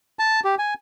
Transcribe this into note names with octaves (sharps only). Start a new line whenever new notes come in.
A5
G4
G#5